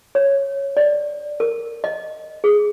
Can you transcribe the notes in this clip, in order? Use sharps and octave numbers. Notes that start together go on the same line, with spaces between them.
C#5
D5
A#4
D#5
G#4